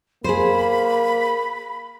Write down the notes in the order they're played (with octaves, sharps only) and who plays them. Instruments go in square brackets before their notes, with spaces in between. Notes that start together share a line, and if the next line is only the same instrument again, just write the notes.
[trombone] A#3 [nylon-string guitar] G#4 C5 [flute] B5